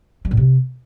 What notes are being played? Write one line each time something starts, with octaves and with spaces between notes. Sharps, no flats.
G3
A2
C3